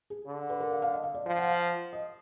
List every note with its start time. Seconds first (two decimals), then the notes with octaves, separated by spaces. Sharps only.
0.10 G#4
0.26 D3
0.50 B4
0.60 A#4
0.71 F5
0.82 F5
0.93 D#5
1.04 F5
1.14 D5
1.26 F3 F5
1.38 F#5
1.48 F5
1.93 D#5